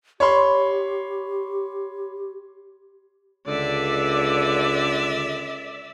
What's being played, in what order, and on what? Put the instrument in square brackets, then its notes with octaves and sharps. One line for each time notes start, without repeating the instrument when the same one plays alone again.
[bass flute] G4 [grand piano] C#5 B5 C6
[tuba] C#2 [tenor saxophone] D3 [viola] D5 E5